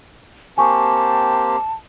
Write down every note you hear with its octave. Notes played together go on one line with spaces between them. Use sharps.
A#3 C4 G4 G#5 A5 C#6